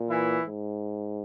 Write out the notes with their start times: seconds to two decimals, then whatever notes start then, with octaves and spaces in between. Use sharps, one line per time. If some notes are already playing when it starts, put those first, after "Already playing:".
Already playing: A#2
0.09 E3 E4
0.46 G#2